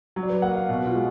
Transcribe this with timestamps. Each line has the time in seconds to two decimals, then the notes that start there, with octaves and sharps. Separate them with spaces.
0.16 F#3
0.23 D5
0.29 B4
0.42 A#3 F#5
0.56 F5
0.69 B2 F#4
0.86 F4
0.95 G#3